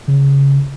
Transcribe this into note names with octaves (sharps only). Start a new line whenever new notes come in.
C#3